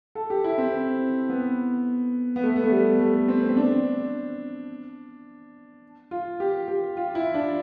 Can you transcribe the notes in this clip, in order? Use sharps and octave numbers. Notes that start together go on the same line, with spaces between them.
A4
G4
E4
C4
B3
B3
A3
B3
A3
G3
A3
C4
C4
D4
F4
G4
G4
F4
E4
D4